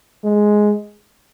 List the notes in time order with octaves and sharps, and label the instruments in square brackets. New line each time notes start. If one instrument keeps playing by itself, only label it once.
[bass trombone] G#3